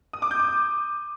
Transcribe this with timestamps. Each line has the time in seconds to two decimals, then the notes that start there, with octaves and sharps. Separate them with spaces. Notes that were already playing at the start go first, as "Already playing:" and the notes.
0.13 D#6
0.22 D6
0.31 G6
0.40 D6
0.48 D#6